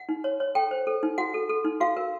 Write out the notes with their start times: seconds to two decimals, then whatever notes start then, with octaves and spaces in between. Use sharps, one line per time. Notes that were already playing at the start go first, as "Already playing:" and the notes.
Already playing: F#5
0.09 D#4
0.24 C#5
0.40 C#5
0.55 A4 G5
0.71 C5
0.87 A4
1.03 D#4
1.18 F#4 F#5
1.34 A4
1.49 A4
1.64 D#4
1.80 F#4 F5
1.97 A#4